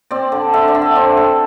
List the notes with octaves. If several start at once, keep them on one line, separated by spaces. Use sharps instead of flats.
C4 D5
D3
D3 E5
D5
D3
E5
C4 D5
D3